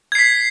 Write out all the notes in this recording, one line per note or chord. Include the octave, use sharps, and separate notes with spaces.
G#6 B6 C7